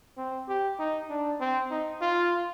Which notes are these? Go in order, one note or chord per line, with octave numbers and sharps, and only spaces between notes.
C4
G4
D#4
D4
C4
D#4
F4